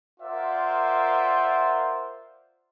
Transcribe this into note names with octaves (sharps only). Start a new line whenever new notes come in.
F4 A#4 C5 D5 E5 F#5